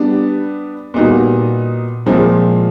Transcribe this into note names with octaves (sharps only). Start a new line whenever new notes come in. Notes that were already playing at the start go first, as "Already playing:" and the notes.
Already playing: G3 B3 D4
A#2 G3 B3 D#4 F#4
A#2 F3 G#3 C4 E4